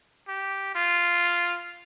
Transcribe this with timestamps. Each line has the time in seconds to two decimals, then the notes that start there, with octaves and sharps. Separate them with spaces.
0.28 G4
0.75 F4